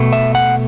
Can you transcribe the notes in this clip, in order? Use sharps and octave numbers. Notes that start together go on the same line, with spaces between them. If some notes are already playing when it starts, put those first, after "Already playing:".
Already playing: B2 A3
E5
F#5